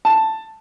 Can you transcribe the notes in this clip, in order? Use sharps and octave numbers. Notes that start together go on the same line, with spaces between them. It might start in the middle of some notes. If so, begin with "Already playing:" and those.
A5